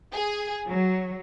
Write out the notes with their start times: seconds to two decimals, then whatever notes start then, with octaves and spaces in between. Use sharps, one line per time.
0.13 G#4
0.67 F#3